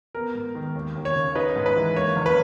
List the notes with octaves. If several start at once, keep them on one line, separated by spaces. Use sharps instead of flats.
B3 A#4
G#2
D#3
D#2
D#2
C#5
C#3
D#4 B4
G#2
B4
E3
A#3 C#5
F#1
B4